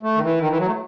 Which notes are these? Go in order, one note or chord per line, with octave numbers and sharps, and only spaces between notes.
A3
D#3
E3
D#3
E3
F#3
A3